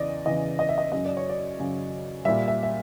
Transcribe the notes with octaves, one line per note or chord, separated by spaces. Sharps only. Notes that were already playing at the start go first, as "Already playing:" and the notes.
Already playing: E2 C#3 E3 D5 D#5
E2 C#3 E3 D#5
D#5
E5
D#5
F#2 C#3 F#3 D#5
D5
C#5
D5
F#2 C#3 F#3
A#2 G3 E5
E5
E5